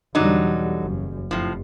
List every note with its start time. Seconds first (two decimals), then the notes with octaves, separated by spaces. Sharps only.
0.15 E2 B2 D3 F#3 G3 D#4
0.80 F#1 F#2
1.31 F1 A2 F3